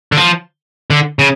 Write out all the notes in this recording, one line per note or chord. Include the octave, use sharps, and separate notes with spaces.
D3
F3
D3
C#3